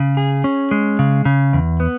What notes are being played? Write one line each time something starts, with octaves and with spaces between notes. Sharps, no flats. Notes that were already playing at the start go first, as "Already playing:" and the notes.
Already playing: C#3
G#4
C#4
G#3
C#3
C#3
E2
B3